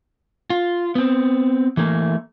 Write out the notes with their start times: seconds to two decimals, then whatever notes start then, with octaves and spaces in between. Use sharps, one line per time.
0.50 F4
0.95 B3 C4
1.77 E3 A3 A#3